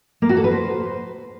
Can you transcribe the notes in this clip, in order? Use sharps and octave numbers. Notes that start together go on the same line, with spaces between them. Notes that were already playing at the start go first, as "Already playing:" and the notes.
A#3
F#4
A4
B4
C5